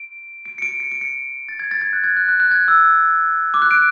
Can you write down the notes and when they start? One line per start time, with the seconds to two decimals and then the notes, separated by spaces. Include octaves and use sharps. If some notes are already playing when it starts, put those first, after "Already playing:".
Already playing: D7
0.45 D7
0.58 C#7
0.62 D7
0.80 C#7
0.92 D7
1.01 C#7
1.49 A6
1.60 G#6
1.71 A6
1.81 G#6
1.93 F#6
2.04 G#6
2.17 F#6
2.29 F#6
2.40 F#6
2.51 G#6
2.68 E6
3.54 D6
3.62 F#6
3.71 D7